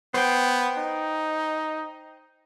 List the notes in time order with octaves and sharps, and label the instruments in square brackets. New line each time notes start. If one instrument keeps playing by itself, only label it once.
[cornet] B3 [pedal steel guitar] C5 G5
[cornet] D#4